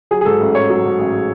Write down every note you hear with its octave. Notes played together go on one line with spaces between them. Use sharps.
F#3 G#4
G#4
G#2 A4
A1
A1 C#5
F#3
G#2
A1